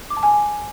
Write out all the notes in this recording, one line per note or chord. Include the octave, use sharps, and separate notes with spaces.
D6
A5
G#5